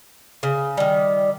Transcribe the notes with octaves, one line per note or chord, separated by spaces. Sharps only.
C#3
D#3 G3